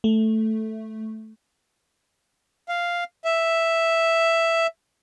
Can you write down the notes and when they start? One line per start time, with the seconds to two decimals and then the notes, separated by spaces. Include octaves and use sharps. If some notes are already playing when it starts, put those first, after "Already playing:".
0.04 A3
2.69 F5
3.24 E5